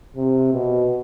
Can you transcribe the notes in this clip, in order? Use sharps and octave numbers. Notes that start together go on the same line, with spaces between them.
C3
B2